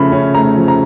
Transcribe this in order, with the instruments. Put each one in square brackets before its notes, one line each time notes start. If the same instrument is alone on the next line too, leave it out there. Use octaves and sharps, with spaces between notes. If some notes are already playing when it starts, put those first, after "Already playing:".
Already playing: [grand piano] C#3 F3 A3 B5
C#4
A3 A#5
F3
A#5